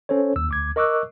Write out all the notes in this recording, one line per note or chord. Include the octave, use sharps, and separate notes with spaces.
C#4 A4 C5 C#5
D#2 E6
D2 D6 G#6
A#4 D#5 C#6 D6 E6 F#6